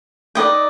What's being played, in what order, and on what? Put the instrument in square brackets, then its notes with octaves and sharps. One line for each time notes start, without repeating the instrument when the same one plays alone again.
[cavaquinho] D#4 B4 D5 D#5 G5